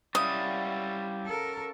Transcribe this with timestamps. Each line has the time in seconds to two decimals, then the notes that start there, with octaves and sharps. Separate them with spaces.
0.15 G3 C#4 E4 F5 F#5 D#6
1.26 A4 A#4